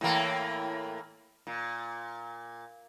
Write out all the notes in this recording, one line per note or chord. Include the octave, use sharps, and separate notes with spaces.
A2 E3 A#3
A#2